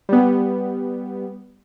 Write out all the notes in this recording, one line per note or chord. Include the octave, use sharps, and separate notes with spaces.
G3 B3